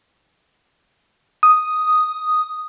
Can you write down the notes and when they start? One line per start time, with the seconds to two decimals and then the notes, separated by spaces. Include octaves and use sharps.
1.43 D#6